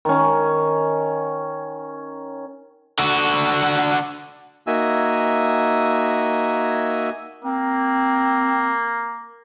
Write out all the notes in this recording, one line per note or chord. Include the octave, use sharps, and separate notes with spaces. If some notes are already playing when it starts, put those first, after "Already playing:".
D#3 C#4
D3 F#4
A#3 D#4 F#4 E5 G#5 E6
A#3 C4